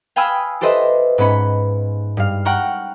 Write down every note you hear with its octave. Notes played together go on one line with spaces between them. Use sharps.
F5 G5 G#5 B5 D#6 E6
G4 A4 B4 C5 D#5 E5
G#2 B3 C#4 B5 C#7
G2 F5
F#5 G5 A#5 C#6 F6